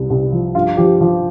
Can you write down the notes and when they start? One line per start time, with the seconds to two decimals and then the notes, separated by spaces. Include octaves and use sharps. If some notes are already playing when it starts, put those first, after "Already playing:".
Already playing: C2
0.10 C2
0.32 F3
0.55 G2 F4
0.77 F3 G4
1.01 F3